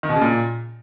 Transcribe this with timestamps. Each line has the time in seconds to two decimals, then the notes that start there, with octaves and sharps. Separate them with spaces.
0.03 D#3
0.09 B2
0.15 C#3
0.21 A#2